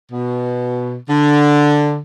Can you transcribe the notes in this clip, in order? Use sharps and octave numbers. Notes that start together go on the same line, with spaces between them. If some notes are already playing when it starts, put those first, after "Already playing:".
B2
D3